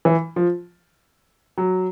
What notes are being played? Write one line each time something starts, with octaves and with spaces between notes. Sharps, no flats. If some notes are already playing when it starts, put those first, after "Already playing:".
E3
F3
F#3